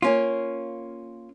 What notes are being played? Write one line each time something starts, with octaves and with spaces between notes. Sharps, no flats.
A#3 C#4 F4